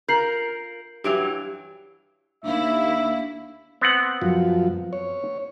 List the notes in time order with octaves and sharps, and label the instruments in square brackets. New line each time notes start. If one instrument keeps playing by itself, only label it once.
[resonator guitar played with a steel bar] F4 A#4 [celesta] G6 C7 F#7
[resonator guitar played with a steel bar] G2 E3 F#3 [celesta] G4 D7 F7
[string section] D#2 E4 [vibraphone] D4 F5 [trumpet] E5
[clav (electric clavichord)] B3 C4 F#5
[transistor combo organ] F#2 F3
C#5